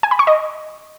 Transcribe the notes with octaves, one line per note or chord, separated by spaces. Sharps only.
G#5
B5
C#6
D#5